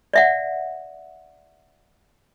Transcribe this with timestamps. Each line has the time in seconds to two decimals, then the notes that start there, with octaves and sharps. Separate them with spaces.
0.14 D5 E5 F#5